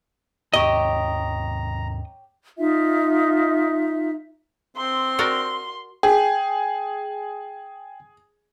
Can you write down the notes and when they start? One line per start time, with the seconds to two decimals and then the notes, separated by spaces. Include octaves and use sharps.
0.54 D#2 G#2 C#4 G4 C#5 D#5 A#5
2.58 D#4 F4 E5
4.77 C4 C6
5.19 F#4 A#4 D5
6.03 G#4 G5